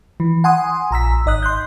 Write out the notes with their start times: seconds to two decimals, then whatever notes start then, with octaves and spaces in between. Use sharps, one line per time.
0.20 E3
0.44 F#5 G#5 C6 D#6
0.91 A#1 A#5 E6 B6
1.26 G#1 D#5 D#6 F#6
1.43 C6 F#6 G6